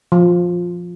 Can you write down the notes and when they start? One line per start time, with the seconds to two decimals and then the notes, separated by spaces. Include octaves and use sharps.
0.12 F3